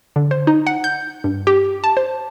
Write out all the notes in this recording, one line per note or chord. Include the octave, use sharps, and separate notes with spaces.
D3
C5
D#4
F#5
G6
G2
G4
A5
C5